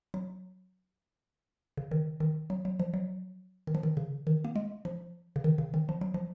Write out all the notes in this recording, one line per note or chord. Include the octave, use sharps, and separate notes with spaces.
F#3
C#3
D#3
D#3
F#3
F#3
F3
F#3
D#3
F3
D#3
C#3
D#3
A#3
G#3
F3
C#3
D#3
C#3
D#3
F3
F#3
F3